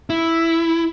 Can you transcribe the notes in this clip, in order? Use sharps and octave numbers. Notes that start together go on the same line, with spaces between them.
E4